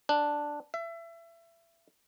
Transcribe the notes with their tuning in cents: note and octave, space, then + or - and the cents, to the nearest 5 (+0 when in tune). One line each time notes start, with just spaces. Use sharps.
D4 +0
E5 +30